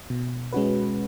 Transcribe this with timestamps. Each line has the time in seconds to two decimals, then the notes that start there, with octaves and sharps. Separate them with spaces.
0.10 B2
0.53 G#3 C#4 F#4 B4